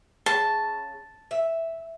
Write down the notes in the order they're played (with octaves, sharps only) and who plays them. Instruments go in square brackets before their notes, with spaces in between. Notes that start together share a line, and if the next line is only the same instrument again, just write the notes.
[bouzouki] C#3 [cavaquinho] A5
[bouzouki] E5